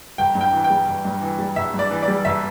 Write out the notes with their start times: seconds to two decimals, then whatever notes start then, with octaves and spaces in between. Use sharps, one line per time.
0.18 G1 G5
0.35 G2
0.41 G5
0.53 E3
0.64 G5
0.70 G3
0.87 G1
1.05 G2
1.22 E3
1.39 G3
1.56 G1 E5
1.74 G2
1.79 D5
1.91 E3
2.03 D5
2.08 G3
2.25 G1 E5